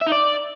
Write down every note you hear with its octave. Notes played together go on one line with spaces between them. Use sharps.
E5
D#4
D5